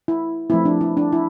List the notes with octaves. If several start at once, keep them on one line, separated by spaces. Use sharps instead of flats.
E4
F3 A3 C4 E4
D4
E4
D4
E4